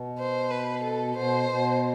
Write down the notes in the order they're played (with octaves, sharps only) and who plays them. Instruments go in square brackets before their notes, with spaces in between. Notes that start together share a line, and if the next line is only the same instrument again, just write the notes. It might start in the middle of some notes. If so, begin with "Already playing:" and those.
Already playing: [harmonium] B2
[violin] C5
B4
A4
[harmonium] B2 [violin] C5
[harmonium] B2